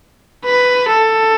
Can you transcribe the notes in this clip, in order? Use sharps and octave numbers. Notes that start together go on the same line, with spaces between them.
B4
A4